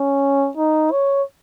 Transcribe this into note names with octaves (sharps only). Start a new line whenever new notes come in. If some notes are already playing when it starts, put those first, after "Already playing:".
Already playing: C#4
D#4
C#5